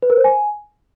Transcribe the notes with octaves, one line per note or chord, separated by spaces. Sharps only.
B4
A#4
C5
G#5